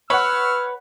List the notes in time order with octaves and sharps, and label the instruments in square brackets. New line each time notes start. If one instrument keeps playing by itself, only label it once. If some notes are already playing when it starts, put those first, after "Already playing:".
[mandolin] B4 [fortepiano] C#5 F#5 [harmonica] E6 F6